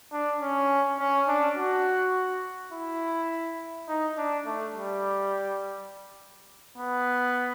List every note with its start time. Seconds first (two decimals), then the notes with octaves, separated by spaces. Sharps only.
0.13 D4
0.41 C#4
1.00 C#4
1.28 D4
1.57 F#4
2.72 E4
3.89 D#4
4.18 D4
4.46 A3
4.75 G3
6.78 B3